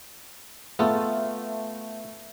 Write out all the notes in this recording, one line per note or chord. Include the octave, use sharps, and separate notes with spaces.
A3 B3 F4 A4